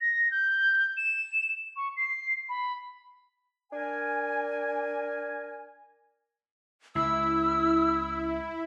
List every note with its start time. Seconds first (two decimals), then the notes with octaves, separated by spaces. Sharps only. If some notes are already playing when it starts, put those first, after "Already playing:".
0.01 A#6
0.31 G6
0.97 E7
1.76 C#6
1.97 C7
2.49 B5
3.72 D4 A#4 G#5
6.95 C#2 E4 E6